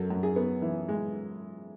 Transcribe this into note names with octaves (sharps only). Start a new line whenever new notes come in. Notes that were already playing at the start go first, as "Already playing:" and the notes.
Already playing: F#2 A4
F#2
G#4
B3
E3
G#3